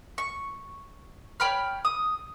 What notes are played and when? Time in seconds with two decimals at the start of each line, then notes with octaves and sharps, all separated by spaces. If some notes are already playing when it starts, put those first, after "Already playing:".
0.18 C#6
1.40 C#5 G5 B5 F6
1.85 D#6